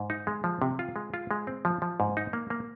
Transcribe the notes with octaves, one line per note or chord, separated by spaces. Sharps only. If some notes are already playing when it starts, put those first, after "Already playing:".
Already playing: G#2
D#4
G#3
F3
C3
F4
G#3
F4
G#3
C4
F3
F3
G#2
D#4
A#3
A#3